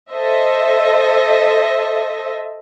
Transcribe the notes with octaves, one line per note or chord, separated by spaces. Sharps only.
A4 C5 D#5 E5